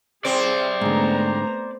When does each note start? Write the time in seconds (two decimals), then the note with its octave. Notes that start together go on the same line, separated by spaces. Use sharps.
0.25 C4 G#4 C5 D5
0.81 G#2 D3 A3 B3 A#5